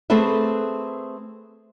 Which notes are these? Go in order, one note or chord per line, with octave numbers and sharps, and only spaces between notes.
A3 C4 G#4 A4 B4 E5